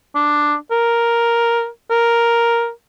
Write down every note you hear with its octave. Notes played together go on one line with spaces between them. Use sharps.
D4
A#4
A#4